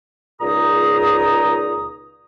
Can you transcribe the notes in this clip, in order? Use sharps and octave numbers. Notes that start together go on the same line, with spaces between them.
C#2 A#2 D#4 G#4 A#5 D#6